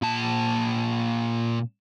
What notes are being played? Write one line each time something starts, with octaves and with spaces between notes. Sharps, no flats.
A#2 A5